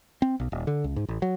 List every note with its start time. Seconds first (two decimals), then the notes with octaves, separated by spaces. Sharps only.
0.22 C4
0.40 B1
0.52 D#1
0.67 D3
0.84 C#2
0.96 G#2
1.08 A1
1.22 F#3